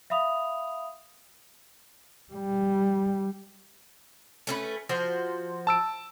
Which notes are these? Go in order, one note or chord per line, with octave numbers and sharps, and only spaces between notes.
E5 F5 B5 D#6 F7
G3
A3 C#4 B4
F3 F#4 C5
A5 E6 D7